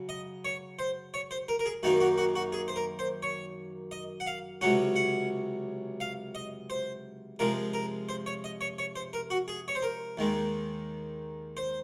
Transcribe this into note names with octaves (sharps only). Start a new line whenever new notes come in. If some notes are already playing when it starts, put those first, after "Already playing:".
Already playing: C#3 F#3
D#5
C#5
C5
C#5
C5
A#4
A#4
G#4
F#2 D#3 A#3 D#4 F#4
F#4
F#4
F#4
G#4
C5
A#4
C5
C#5
D#5
F#5
F5
C#2 C3 F#3 C#4 F#5
F#5
F5
D#5
C5
C3 F3 G#3 A#4
A#4
C5
C#5
D#5
C#5
C#5
C5
A#4
F#4
G#4
C#5
C5
A#4
D#2 D#3 G#3
C5